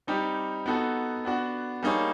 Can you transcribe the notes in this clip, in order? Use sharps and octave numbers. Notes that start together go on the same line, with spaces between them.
G3 C4 D#4 G4
B3 D#4 F#4 A4
B3 D4 F#4
G3 A#3 D#4 G#4 C#5